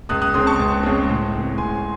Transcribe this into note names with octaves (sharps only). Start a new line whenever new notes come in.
C#2 D#6 F#6
D#6 F#6
C#3 G#3 C4 C6 D#6
A5 C#6
C#2
C#3 G#3 C4
A2
G#3 C4
A2 G#5 C6